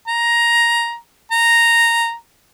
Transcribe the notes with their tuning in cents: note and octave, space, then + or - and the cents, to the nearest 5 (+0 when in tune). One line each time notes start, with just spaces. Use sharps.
A#5 +10
A#5 -5